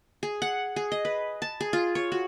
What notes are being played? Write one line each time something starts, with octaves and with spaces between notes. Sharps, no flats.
G#4
F#5
G#4
D#5
B4
A5
G#4
F4
C#5
F#4